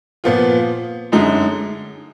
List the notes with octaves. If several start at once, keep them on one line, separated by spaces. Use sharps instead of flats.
A#2 F3 B3 F4
F#2 D3 G#3 D#4